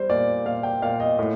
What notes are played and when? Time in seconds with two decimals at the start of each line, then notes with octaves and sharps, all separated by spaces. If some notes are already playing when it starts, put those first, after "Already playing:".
Already playing: G3 C5
0.09 A#2 D5
0.46 A#2 F5
0.63 G5
0.82 A#2 F5
1.00 D#5
1.19 A2